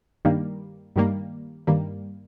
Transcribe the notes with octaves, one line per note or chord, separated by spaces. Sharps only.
G2 D#3 G3 A#3
G2 D#3 G3 A#3
G2 D#3 G3 A#3